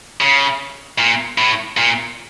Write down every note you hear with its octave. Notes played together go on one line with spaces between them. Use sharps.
C#3
A#2
A2
A#2